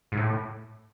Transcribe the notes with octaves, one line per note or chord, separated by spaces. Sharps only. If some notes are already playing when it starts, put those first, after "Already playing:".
G#2
A2